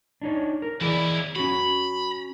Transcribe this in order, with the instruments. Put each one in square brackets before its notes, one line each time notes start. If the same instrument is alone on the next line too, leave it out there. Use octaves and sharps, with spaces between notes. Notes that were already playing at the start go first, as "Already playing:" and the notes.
[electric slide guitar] D4 D#4 C#5
A#4
[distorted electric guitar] D#2 E4 [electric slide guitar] E3 G#4 D5
[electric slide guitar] C#4 F#4 [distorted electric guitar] B5